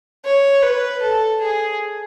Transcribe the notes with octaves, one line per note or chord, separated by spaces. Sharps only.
C#5
B4
A4
G#4